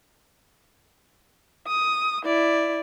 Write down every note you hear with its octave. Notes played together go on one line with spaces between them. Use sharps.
D#6
E4 D5